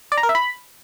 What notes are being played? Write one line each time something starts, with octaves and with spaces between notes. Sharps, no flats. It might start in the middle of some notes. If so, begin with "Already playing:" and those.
D5
A#5
A#4
E5
B5